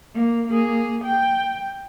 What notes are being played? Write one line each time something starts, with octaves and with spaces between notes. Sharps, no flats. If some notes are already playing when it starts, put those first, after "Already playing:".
A#3
A#3 G#4
G5